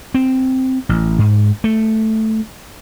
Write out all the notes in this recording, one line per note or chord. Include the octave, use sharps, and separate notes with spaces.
C4
A1
G#2
A3